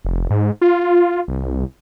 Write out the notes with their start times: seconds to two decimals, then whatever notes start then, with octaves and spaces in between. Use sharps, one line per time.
0.05 F1
0.30 G#2
0.61 F4
1.28 C2